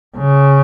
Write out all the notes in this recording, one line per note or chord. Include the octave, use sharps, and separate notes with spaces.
C#3